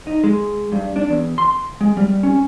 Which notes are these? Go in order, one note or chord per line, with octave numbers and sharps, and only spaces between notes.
D#4
G#3
G2
D4
E2
C6
G#3
G3
C#4